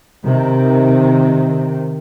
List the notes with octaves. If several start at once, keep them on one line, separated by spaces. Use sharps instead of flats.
C3 D#3